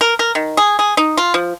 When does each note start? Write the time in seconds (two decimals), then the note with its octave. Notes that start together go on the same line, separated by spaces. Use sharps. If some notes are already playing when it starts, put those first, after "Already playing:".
0.01 A#4
0.19 A#4
0.35 D#3
0.57 G#4
0.79 G#4
0.97 D#4
1.17 F4
1.34 F3